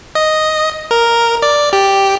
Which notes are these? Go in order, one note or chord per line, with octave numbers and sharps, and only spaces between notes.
D#5
A#4
D5
G4